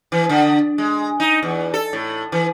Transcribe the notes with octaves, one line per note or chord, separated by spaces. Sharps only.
E3
D3
G#3
D#4
E2
A4
A2
E3